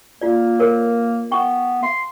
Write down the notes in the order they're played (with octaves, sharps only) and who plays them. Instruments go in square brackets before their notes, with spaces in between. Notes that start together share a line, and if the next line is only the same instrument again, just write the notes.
[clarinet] A#3 [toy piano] F4 D5
[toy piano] A4 A#4 C#5
[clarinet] B3 [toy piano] G5 C#6
[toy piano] F5 [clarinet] C6